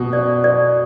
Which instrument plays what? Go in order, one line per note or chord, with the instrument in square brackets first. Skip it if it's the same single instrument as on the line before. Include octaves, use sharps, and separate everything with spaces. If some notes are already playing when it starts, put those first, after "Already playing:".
Already playing: [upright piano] B2
[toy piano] D5
D5